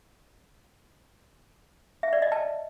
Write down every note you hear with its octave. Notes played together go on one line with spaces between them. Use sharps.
E5
D5
D#5
A5